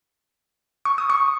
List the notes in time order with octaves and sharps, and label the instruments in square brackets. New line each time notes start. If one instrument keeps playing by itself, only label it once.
[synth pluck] C#6
D#6
C#6